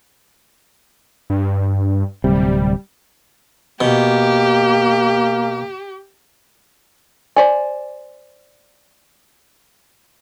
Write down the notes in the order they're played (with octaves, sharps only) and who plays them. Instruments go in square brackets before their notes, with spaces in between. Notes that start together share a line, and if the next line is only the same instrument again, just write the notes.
[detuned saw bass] G2
[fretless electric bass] D1 C3 [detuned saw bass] G3
[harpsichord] B2 [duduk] A#3 [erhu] G4
[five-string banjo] C5 D5 G#5